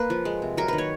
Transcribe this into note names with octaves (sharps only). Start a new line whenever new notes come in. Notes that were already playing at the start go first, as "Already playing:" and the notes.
Already playing: A#3 B4
F3
G#3
C3
F#3 A#4
D#3 B4
C#5